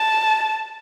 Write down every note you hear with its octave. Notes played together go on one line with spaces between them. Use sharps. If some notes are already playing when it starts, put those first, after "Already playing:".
Already playing: A5